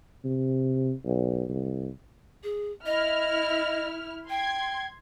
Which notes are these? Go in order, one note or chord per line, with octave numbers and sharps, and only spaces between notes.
C3
B1
C2
G#4
E4 D#5 F6
G5 C6 G#6